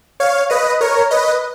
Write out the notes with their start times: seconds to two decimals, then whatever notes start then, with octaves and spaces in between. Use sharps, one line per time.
0.20 C#5 F5
0.50 B4 D#5
0.81 A#4 C#5
1.11 B4 D#5